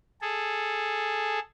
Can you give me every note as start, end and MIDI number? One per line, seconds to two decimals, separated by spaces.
0.21 1.39 68
0.21 1.39 69